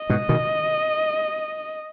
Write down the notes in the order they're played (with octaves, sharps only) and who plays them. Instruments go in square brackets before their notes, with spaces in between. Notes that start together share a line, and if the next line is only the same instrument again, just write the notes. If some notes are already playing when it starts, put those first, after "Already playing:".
Already playing: [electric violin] D#5
[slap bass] G#2 B2
B2 D#3